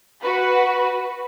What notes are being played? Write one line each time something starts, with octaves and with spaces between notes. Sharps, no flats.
F#4 B4